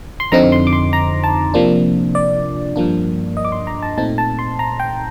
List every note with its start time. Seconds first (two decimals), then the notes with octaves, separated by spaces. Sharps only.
0.20 C6
0.32 F2 D3 F3 C4 D#4 A#5
0.52 C6
0.67 D6
0.73 C6
0.93 A#5
1.24 A5
1.54 C3 F3 A#3 D4
2.15 D5
2.76 G2 F3 A#3 D4
3.37 D#5
3.45 D6
3.52 C6
3.67 A#5
3.82 A5
3.98 A#2 A3 C4 D#4 A5
4.18 A5
4.39 C6
4.59 A#5
4.80 G5